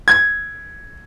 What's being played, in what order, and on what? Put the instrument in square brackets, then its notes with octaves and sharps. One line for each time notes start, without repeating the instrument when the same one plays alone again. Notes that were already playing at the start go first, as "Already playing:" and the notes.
[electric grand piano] G#6